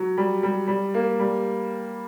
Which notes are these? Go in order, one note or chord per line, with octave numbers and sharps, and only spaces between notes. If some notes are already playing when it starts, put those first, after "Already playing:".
Already playing: F#3
G3
G3
G3
A#3
G3